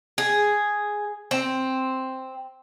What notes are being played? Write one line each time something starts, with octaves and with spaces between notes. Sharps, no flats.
G#4
C4